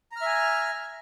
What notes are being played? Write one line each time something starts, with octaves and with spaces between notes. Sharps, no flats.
E5 G#5 A#5 F6